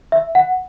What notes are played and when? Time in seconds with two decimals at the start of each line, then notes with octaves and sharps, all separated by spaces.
0.12 E5
0.35 F#5